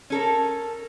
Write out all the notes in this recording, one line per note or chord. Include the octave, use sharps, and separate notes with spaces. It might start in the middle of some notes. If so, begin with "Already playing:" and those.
C#4 A4 A#4